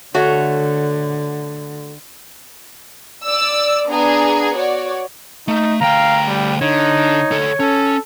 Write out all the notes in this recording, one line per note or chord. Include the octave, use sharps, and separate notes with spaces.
D3 A3 F#4 C#5
D5 E6
B3 D4 G#4 A#5
F#4 C#5 D5
A3 D#4
D2 F5 G5 A#5
G3
D3 D#4 C#5
D2 A4
C#4 A4